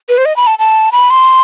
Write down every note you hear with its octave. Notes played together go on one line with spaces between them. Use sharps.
B4
C5
D#5
B5
A5
A5
B5
C6